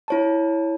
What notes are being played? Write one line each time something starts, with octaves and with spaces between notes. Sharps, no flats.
E4 C#5 A5